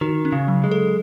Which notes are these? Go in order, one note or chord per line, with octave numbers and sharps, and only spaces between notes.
D#3 F#4
C#4
C#3
F#3
G#3
A4